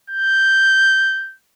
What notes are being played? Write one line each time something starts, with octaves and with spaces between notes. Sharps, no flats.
G6